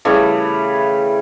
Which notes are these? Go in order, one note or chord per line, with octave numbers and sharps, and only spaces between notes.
C#3 E3 G3 A3